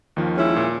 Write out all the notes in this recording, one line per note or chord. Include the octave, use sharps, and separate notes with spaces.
D#2 D#3 F3
G#3 C#4 E4
A#2